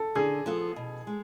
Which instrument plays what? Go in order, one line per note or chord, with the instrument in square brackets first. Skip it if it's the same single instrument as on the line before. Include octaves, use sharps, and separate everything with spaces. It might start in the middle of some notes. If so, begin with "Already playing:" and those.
Already playing: [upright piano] A4
[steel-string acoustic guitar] D3 [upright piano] G#4
[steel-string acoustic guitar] F3 B3 F4 A4
B2
G#3